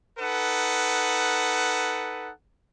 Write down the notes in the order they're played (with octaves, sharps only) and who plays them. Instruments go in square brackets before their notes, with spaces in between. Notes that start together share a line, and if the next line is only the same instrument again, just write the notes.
[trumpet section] D#4 A4 B4 F#5